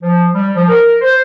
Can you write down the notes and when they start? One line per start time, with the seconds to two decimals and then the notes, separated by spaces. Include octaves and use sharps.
0.02 F3
0.35 G3
0.55 F3
0.69 A#4
1.01 C5